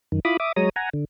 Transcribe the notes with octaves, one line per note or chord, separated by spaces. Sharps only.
F#2 D#3
E4 F4 B5 D6 D#6
E5 D6 D#6
F#3 G#3 C#5 A#5 D#6
F#5 G#5 A#5
D3